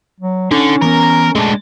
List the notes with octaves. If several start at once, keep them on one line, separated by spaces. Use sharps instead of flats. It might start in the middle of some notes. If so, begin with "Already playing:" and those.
F#3
D3 C#4 D#4
E3 B3 A#4
G#3 A3 D4 A5